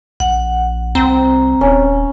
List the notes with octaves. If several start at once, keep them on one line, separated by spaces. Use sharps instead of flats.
A#1 F#5
C2 C4 A#5
D#1 C#4